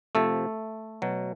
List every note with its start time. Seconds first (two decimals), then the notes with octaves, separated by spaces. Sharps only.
0.15 C3 F3 A3 A4
1.02 B2 F#3